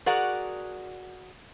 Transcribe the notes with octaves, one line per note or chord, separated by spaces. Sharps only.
F#4 G#4 A#4 D5 F#5